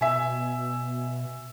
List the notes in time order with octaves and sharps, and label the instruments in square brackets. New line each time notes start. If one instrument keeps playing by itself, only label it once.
[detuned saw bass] B2 [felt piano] E5 G#5